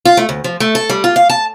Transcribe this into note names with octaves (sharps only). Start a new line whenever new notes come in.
F4
A3
D2
F3
A3
A4
G3
F4
F5
A5